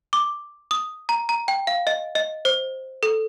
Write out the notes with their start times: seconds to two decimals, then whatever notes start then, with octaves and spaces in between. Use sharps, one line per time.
0.13 D6
0.71 D#6
1.09 A#5
1.29 A#5
1.48 G5
1.67 F5
1.87 D#5
2.15 D#5
2.45 C5
3.03 A4